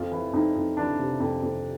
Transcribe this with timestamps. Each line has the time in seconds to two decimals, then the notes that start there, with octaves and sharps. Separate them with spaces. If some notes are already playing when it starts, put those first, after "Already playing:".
Already playing: F2 F4
0.11 E3
0.33 F2 D#4
0.56 F2
0.77 E3 D4
0.99 C3
1.20 F2
1.43 F2